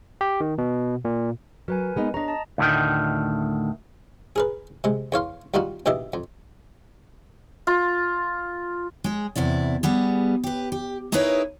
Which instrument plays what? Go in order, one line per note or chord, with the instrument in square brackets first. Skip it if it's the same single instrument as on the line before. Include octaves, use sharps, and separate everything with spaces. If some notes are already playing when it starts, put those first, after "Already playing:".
[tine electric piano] G4
D#3
B2
A#2
[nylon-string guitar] F#3 [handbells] A#4 B4 G#5
[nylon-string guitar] G#3 B3 D#4
[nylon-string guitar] D4 C#5 [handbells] D#5 A#5
[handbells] D#5 A5
[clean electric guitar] D2 A2 D#3
[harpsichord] G#4 A#4 B4
C3 G#3
E2 C#5 F5 C6
D#2 G3 D#4 F4 F#4
A#1 B2 D#3 G4 D#5 E5
F2
[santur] F4
[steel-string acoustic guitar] G#3 G#4
E2 C3 E4 D5
G3 B3 G#4
G4 B4
G4
D#4 E4 G#4 A#4 B4 C#5